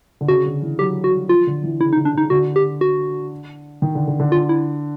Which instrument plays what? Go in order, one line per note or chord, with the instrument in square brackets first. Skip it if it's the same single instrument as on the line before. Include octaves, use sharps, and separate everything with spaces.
[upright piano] D3
[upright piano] C#3 [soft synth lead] F#4
[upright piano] D3
E3
[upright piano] F#3 [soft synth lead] G4
[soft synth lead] F#4
[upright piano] G3
[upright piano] F3 [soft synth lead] F4
[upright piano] D3
E3
[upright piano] C#3 [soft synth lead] E4
[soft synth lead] D#4
[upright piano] D3
[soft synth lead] D4
[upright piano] C#3 [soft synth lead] D#4
[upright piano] D3 [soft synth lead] F#4
[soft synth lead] G4
F#4
[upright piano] D#3
D3
D3
D3
[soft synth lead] F4
E4